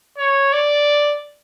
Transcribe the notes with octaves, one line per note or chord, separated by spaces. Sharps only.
C#5
D5